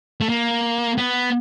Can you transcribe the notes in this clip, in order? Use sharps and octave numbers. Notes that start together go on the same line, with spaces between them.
A3
A#3
B3